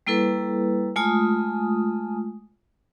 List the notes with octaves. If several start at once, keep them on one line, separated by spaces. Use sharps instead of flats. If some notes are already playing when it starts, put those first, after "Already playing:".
G3 A#3 E4 A4 B4
G#3 A3 F4 G#5 D#6